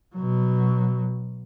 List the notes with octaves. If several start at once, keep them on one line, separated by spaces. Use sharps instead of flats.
B2 F#3